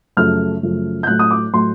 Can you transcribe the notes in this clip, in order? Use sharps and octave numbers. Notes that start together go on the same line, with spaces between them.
F#2 C#3 F3 A3 F6
F#2 C#3 F3 A3
G6
A2 F#3 A3 F#6
D#6
D6
A2 F#3 A3 C6